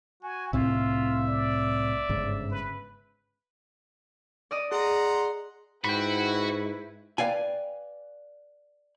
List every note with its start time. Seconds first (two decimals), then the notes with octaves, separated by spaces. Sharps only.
0.23 F#4 G#5
0.53 C2 A2 C4 F4 E5
1.28 D5
2.09 G1 G#2 C#3
2.51 B4
4.51 D5 D#5 D#6
4.72 G#4 F#5 A#5 C6
5.84 G#2 E4 F#4 B4 G5 B5
7.18 B4 D5 F5 G5 G#5